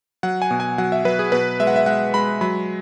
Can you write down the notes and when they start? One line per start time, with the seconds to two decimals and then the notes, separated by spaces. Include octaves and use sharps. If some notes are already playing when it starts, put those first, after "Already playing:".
0.23 F#3 F#5
0.42 G#5
0.51 B2
0.60 G#5
0.78 F#3 F#5
0.92 E5
1.05 F#3 B4
1.19 G#4
1.32 B2 B4
1.60 G#3 E5
1.67 F#5
1.76 E5
1.86 G#3 F#5
2.14 G#3 B5
2.41 F#3 B5